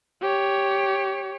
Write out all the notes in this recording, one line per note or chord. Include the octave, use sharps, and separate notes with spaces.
G4 C#5